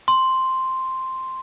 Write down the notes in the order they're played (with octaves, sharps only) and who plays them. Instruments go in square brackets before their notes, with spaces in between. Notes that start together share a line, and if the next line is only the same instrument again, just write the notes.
[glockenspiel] C6